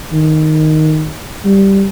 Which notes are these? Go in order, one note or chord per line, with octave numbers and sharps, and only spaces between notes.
D#3
G3